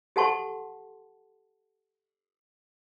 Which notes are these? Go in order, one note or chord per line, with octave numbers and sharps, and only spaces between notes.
G4 A4 F#5 A5 C6 C#6